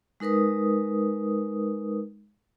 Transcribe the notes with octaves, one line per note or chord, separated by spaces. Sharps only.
G#3 D#4 A#4 B4 D#6